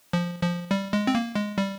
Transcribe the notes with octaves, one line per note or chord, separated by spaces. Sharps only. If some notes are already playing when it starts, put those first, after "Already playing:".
F3
F3
G3
G#3
C4
A#3
G#3
G3